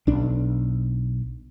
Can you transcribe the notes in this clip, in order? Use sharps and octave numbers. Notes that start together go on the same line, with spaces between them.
B1 D4